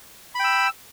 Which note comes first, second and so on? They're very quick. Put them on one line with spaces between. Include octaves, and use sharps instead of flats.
B5 G5 E6